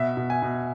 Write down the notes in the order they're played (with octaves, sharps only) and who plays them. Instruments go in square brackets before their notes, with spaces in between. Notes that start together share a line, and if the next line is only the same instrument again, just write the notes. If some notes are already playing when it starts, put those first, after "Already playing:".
Already playing: [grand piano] B2 E5
B2
G#5
B2